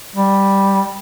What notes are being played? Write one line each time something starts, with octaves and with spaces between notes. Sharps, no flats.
G3